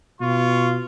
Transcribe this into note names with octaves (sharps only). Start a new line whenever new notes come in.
B2 F4 C#6